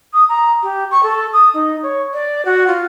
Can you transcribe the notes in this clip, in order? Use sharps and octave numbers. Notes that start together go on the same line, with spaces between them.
D#6
A#5
G4
C#6
A4
D#6
D#4
C#5
D5
F#4
F4